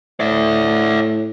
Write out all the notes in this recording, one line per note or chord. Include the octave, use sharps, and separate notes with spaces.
A2 D5 E5